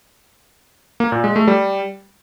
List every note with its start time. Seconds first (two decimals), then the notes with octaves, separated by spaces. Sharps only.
1.00 A#3
1.12 A#2
1.24 G#3
1.36 A3
1.48 G3